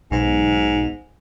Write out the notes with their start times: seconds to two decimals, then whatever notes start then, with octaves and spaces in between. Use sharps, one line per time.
0.11 B1 G#2